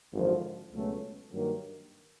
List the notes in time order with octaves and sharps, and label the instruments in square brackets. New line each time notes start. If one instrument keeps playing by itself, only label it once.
[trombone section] G#1 F#2 D3 F3
C#2 B2 F#3 A3 C#4
G2 D#3 F#3 A#3